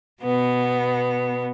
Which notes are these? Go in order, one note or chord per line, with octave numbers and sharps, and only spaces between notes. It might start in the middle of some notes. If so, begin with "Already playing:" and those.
B2 B3